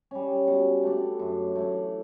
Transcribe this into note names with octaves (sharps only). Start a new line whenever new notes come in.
G3 C#4
B2
A3 D4
F#2
E3 A3